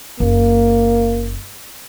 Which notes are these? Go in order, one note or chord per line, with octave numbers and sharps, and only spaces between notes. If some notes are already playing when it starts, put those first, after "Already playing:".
F#1 A#3